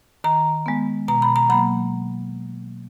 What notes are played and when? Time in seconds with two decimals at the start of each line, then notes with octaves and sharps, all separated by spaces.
0.24 D#3 A#5
0.66 G#3 B3
1.08 B2 A#5
1.22 B5
1.36 A#5
1.49 F#3 A#3 B5